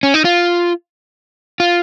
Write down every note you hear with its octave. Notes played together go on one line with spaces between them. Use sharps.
C#4
D#4
F4
F4